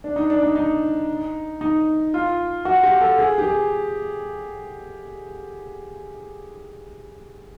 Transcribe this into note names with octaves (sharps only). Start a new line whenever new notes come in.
D4
D#4
D4
D#4
D#4
D#4
F4
F#4
G4
A4
G#4
G4
G#4